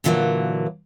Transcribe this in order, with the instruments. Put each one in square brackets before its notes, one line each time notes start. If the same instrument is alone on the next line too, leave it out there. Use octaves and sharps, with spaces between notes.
[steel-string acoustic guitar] A#2 D3 E3 F#3 G3 A#3